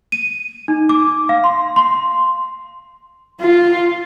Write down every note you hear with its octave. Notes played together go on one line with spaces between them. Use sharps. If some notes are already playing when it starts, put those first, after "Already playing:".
D#7
D#4
D6
F5
C6
C6
F4